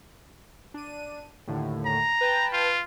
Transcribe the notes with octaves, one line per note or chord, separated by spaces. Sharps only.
D4 D#7
D#2 A2 D3
A#5
B4 G5 A5
F4